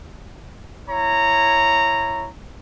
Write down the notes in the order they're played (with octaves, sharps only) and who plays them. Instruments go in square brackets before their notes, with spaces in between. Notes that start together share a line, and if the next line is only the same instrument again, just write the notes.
[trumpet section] E4 C#5 A#5